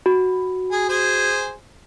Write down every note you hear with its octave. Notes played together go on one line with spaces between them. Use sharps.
F#4
G#4
G#4 C5 G#5